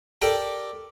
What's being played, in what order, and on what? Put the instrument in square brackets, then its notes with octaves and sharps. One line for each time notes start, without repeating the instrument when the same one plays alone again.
[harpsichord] G4 A4 A#4 D5 G5